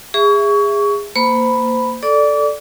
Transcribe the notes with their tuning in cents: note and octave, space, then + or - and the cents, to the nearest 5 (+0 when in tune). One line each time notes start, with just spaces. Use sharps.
G#4 -25 E5 +10 C#6 +25
A#3 -15 C5 -25 B5 +0
A4 +0 D5 +0 D6 -35